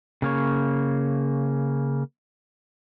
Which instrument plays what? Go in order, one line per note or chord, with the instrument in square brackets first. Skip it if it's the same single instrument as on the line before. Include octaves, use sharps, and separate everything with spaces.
[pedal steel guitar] C#3 A#3 C#5